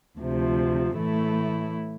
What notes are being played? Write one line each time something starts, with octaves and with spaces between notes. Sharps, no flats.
D2 C3 F3
A2 E3 A3 E4